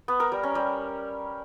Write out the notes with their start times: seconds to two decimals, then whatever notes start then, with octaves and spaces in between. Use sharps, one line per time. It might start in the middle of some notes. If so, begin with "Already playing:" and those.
0.08 B3
0.20 A#4
0.32 G3
0.43 C#4
0.55 G3